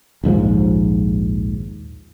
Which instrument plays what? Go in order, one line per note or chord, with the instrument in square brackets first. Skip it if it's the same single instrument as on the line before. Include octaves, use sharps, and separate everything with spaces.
[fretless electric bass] A#1 D#2 G#2 F3